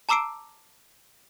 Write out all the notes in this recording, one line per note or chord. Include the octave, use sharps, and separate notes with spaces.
A5 A#5 D6 E6 C7 D7